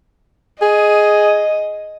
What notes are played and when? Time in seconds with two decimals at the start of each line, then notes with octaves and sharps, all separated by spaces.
0.62 G#4 D#5